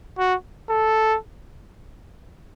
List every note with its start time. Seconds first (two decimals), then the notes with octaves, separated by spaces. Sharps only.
0.18 F#4
0.70 A4